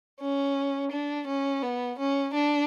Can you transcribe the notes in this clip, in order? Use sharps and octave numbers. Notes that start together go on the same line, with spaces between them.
C#4
D4
C#4
B3
C#4
D4